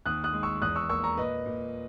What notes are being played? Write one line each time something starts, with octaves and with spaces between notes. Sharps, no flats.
D#2 D#6 F#6
D#6 F#6
G#3
C#6 E6
E2 D#6 F#6
C#6 E6
A#3 C#6 E6
A#5 C#6
A#2 B4 D#5
A#2